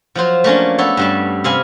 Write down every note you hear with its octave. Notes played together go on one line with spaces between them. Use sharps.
F3 F#3 C5
A3 A#3 C#4 D4
B3 A4 C#5
G2 G3 A5
C3 F5 G#5 B5